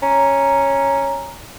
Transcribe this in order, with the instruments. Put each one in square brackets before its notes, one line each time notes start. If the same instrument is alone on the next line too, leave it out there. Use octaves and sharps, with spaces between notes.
[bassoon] C#4 [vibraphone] A#5